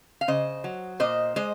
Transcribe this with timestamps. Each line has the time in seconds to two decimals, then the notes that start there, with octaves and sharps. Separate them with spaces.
0.21 F5
0.28 C#3 C5 D#5
0.64 F#3
1.00 A#2 C5 D#5
1.36 G#3 C5 D#5